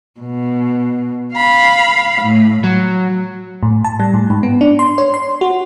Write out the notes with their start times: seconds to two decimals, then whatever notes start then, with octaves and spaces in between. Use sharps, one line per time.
0.20 B2
1.35 F5 B5
2.21 A2
2.64 F#3
3.63 A2
3.84 A5
4.00 G3
4.14 A2
4.30 G#2
4.43 B3
4.61 D4
4.79 C6
4.98 C#5
5.14 C6
5.41 F#4